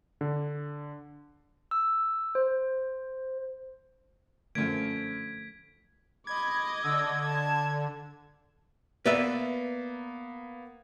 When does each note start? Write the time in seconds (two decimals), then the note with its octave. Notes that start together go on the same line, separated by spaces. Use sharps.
0.21 D3
1.71 E6
2.35 C5
4.55 F#2 D3 F3 A3 A#3 G#6 B6 D7
6.27 D#5 B5 D6 G#6
6.84 D3 E6
7.23 A5
9.06 A#3 B3 B4 D5 E5